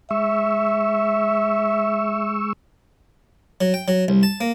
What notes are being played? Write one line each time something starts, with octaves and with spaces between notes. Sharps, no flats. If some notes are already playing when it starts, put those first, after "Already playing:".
G#3 E5 C#6 E6
F#3
G5
F#3
C2
A5
A#3